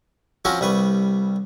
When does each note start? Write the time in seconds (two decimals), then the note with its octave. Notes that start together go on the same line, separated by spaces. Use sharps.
0.45 F3 C4 C#4 F#4 A#4
0.61 C2 G3 B4 C#6